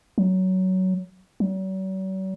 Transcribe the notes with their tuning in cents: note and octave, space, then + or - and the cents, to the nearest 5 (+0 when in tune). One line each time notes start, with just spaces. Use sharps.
F#3 +15
F#3 +45